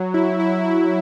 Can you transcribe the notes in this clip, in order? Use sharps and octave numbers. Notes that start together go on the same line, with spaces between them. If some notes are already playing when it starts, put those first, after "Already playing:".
Already playing: F#3
E4
E4
E4